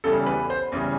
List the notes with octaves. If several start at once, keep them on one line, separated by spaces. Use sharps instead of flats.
E2 C#3 E3 G3 A4
B4
C5
E2 C#3 E3 G3